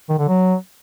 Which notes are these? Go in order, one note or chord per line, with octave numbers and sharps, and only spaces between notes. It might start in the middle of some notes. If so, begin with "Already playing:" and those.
D#3
D3
F#3